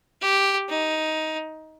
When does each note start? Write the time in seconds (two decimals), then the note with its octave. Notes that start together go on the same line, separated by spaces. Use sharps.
0.21 G4
0.69 D#4